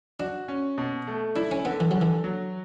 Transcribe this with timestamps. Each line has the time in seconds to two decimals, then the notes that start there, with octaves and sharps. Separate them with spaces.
0.20 D4 F#4
0.48 C#4
0.78 B2
1.07 A3
1.36 D4 E4
1.51 C#4
1.65 D3 B3
1.80 E3
1.91 D3 F#3
2.01 E3
2.24 F#3